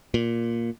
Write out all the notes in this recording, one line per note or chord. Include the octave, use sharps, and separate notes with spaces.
A#2